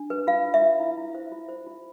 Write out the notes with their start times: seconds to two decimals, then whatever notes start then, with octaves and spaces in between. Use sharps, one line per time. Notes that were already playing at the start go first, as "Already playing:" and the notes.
Already playing: D4
0.10 B4
0.27 F4 F5
0.45 B4
0.54 E5
0.62 F4
0.80 E4
0.98 E4
1.15 C5
1.32 F4
1.49 C5
1.66 F4